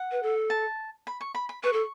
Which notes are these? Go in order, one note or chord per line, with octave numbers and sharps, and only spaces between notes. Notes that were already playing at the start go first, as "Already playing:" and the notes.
Already playing: F#5
B4
A4
A5
B5
C#6
B5
B5
B4 C#6
A4